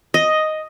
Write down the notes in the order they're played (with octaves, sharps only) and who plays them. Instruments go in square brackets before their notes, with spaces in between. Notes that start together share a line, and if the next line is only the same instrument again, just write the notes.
[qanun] D#5